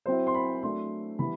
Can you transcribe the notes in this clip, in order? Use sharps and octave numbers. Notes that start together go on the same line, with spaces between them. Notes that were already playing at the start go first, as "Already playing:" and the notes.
F#3 C4 E4 C5
C6
B5
F#3 A3 D4 C6
E3 G3 B3 B5